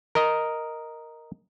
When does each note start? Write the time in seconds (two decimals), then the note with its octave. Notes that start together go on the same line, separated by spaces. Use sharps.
0.15 A#4 D#5